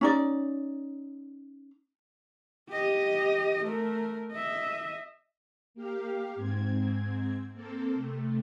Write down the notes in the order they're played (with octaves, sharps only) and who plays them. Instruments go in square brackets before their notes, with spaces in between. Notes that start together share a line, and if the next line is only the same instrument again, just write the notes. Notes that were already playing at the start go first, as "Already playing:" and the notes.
[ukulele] C#4 D#4 D5
[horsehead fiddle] G4 D#5
A3 A#4
D#5 E5
[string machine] A#3 G4 F5
G#2 C4 G#6
A#3 C4 A4
C3 A3